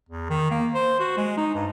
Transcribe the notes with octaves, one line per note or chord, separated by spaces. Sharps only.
E2
D#3
A#3
C5
F#4
G#3
D#4
G2